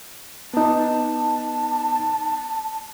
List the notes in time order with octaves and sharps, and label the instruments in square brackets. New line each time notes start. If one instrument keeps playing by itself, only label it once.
[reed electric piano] B3 D#4 [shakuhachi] A5